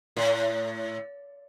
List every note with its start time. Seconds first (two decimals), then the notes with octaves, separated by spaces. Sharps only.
0.17 A2